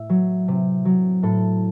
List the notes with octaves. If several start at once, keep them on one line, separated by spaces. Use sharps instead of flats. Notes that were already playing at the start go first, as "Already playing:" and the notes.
Already playing: A2 E5
F#3
C3
F#3
A2 A4